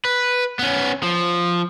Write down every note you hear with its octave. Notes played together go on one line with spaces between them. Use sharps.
B4
B3 C#4
F3